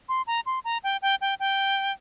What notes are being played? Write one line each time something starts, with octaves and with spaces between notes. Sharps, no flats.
C6
A#5
C6
A#5
G5
G5
G5
G5